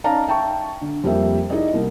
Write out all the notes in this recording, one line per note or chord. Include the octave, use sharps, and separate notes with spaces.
C#4 D#4 D5 F5 A5 A#5
E5 G5 A5 C#6
D3
F2 G3 A#3 E5 G5
D#4 E4 G#4 D5 D#5
C2 A#3